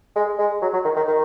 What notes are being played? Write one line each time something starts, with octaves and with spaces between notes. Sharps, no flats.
G#3
G#3
F#3
F#3
D#3
D#3
D#3